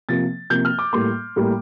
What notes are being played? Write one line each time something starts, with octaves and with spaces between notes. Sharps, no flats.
C3 F3 A#3 A6
C3 F3 A#3 G6
F6
D6
A2 G3 A#3 C6
A2 G3 A#3